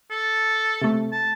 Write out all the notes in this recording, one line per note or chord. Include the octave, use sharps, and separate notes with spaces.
A4
C3 A3
A5